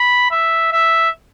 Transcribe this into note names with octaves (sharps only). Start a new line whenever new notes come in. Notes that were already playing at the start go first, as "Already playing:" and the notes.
Already playing: B5
E5
E5